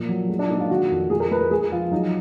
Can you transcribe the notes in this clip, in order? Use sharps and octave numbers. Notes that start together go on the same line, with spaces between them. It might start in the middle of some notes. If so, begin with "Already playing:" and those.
Already playing: A#2 F3
F#3
G#3
D4
A#2 D#4
F4
D#3 F#4
F2
G#3 G#4
A#4
G#3 B4
A#4
G#3 G#4
G#4
F3 F4
F#3 D#4